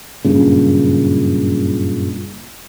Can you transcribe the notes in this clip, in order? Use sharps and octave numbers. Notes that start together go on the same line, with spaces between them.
F#1 G2 A#2 C#3